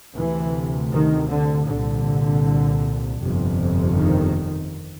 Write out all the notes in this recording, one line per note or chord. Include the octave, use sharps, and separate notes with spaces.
D2 C3 E3
D#3
D3
C2 A#2 D3
G1 F2 C3
D#3